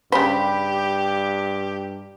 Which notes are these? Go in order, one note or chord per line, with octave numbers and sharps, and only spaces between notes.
G2 C#3 G4 C5 B5